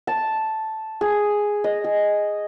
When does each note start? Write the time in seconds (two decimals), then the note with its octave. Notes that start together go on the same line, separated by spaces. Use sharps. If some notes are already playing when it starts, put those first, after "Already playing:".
0.07 A5
1.01 G#4
1.64 D#5
1.84 G#4